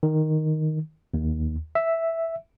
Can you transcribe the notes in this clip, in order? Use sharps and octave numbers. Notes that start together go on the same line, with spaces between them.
D#3
D#2
E5